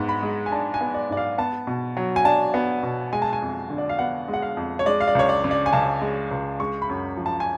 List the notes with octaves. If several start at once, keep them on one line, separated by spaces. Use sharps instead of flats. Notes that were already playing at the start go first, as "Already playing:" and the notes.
Already playing: G#2 B3
B5
G#3
G#5
D4 A5
G#5
B3
D5
G#2 D5
F5
B3 A5
B2
F#3
G#5
D4 A5
B3
B2
G#3 G#5
A5
G#5
F2
D3
D5
F5
B3 F#5
G#3
F#5
F5
F2
C#5
G#3 D5
F5
D5
C#2 C#5
D5
C#3
D5
G#5
C#2 A5
G#3
C#2
G#3 C#6
B5
F#2
F3
A5
G#5